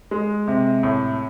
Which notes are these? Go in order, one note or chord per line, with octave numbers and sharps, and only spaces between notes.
G#3
C3
A2